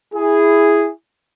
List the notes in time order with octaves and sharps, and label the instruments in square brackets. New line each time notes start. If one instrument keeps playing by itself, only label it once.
[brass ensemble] E4 G#4